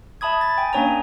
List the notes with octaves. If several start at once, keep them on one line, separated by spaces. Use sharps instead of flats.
E5 A5 B5 D#6 G#6
A6
G5 G#5
A#3 C#4 D4 C#5 G#5 A#5